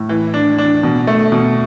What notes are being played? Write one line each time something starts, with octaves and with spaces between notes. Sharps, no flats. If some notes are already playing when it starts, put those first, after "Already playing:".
Already playing: A2
E3
D4
D4
B2
A3
B2